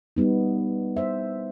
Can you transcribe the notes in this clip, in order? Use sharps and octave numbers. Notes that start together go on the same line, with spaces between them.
G3 B3 D#4
C5 E5